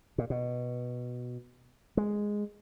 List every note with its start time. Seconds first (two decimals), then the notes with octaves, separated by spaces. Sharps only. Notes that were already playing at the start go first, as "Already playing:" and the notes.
0.18 A#2
0.30 B2
1.97 G#3